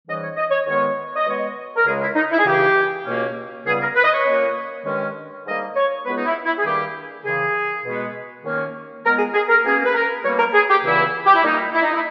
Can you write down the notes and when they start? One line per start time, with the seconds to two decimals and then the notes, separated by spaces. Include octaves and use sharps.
0.07 G#2 E3 G3 C#4 D#5
0.21 C#5
0.36 D#5
0.51 C#5
0.66 E2 D#3 G#3 B3 C#5
1.16 D#5
1.26 B2 G#3 B3 C#5
1.76 A#4
1.86 C#2 C#3 G#3 C#4 G#4
2.01 E4
2.15 D#4
2.31 E4
2.38 G#4
2.46 C#2 C#3 E3 G4
3.05 C#2 B2 A#3 C#4
3.65 C#2 C#3 G3 B3 G#4
3.80 A#4
3.95 B4
4.04 D#5
4.10 C#5
4.25 A#2 A#3 C#4
4.85 G2 D#3 G#3 C#4
5.44 G#2 G3 A#3 D#5
5.75 C#5
6.04 C#2 B2 G#3 B3 B4
6.15 D#4
6.25 E4
6.45 E4
6.58 G#4
6.65 G2 D#3 G3 A#3 G4
7.24 D#2 C#3 E3 G#3 G#4
7.84 B2 G#3 B3
8.44 D#2 D#3 A#3 C#4
9.04 A#2 G#3 B3 A#4
9.19 G#4
9.34 G#4
9.48 A#4
9.64 B2 A#3 C#4 G#4
9.85 B4
9.94 A#4
10.23 B2 G3 A#3 C#5
10.39 A#4
10.54 G#4
10.69 G4
10.83 C#2 C#3 E3 G3 B3 E4
11.26 G4
11.35 E4
11.43 A#2 G3 A#3 D#4
11.73 E4
11.82 D#4
11.93 E4